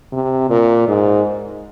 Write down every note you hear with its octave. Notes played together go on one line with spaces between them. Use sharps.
C3
A#2
G#2